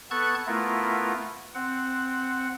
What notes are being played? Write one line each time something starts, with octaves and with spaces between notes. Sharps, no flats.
B3 A4 A5 C#6 F#6 G#6
A3 B3 E4 F4 A#4
C4 F#5